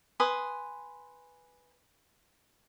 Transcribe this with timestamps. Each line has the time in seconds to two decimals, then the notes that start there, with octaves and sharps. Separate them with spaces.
0.20 B4 G#5 C6 D#6